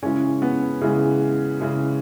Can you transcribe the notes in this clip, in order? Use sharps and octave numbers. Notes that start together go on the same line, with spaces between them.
C#3 E3 G#3 C#4
B3
C#3 E3 G#3
C#3 E3 G#3